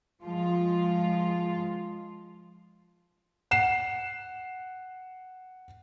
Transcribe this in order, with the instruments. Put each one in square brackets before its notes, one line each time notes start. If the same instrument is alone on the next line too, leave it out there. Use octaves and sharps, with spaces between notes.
[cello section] F3 G#3 F4
[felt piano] F#5 C7 E7